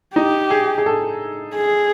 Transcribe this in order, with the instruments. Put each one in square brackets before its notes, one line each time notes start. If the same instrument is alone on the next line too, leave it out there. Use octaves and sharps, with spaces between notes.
[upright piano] D#4 [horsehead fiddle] G4
[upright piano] G#4
G#4
A4
[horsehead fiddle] G#4